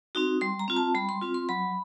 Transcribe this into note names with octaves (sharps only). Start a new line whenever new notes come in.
C4 D#4 F#4
G3 C6
A#5
C4 F4
A5
G3 B5
C6
C4 F4
C6
F#3 B5